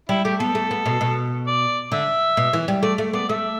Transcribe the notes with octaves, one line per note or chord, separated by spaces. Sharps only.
G3 E4
A3 G4
B3 A4
A3
B3
B2
B2
D5
D3 E5
B2
E3
G3
A3 D5
A3
B3 D5
A3 E5